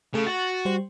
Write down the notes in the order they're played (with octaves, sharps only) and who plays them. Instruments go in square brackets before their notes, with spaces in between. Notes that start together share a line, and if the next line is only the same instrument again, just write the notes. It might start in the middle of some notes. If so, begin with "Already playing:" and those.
[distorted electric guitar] C#3 [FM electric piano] A3 A4
[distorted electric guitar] F#4 [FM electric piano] A6
[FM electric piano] G3 C5